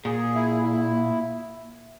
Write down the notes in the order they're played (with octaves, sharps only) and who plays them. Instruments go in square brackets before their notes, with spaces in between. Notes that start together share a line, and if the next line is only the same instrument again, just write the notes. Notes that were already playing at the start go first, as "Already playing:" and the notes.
[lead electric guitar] A#2 [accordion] G#4
[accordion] E4
E4